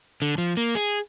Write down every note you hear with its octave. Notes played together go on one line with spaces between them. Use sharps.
D3
F3
A#3
G#4